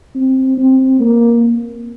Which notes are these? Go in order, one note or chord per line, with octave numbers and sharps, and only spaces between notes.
C4
C4
A#3